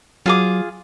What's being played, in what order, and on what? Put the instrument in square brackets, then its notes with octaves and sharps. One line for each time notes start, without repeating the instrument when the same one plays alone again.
[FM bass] F#3 [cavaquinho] F4 G#4 D6